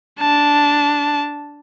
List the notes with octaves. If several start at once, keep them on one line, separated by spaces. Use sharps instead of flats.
D4 A5